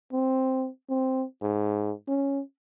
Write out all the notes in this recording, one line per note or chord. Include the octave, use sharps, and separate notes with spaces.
C4
C4
G#2
C#4